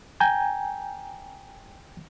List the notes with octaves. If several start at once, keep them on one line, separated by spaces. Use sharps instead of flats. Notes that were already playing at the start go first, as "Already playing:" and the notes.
G5 G#5 A#5 G6